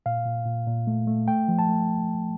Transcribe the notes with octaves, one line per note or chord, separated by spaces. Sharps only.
A#2 F5
A#2
A#2
A#2
A3
A3
A3 G5
F3
A5
A3